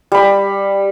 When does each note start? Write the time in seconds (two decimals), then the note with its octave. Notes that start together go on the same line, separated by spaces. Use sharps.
0.12 G3 B5